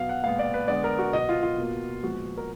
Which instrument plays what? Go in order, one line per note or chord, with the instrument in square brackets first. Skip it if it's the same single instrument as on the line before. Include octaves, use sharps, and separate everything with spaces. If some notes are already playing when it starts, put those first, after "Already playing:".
Already playing: [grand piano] B2 F#3 B3 F5
F#5
A#2 G#3 B3 F5
D5
B4
D3 G#3 B3 D5
A#4
F#4
B2 F#3 B3 D#5
F4
F4
B2 A#3
A#2 F3 G#3 B3 F#4
A#4